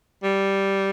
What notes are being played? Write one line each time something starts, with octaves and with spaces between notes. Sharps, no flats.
G3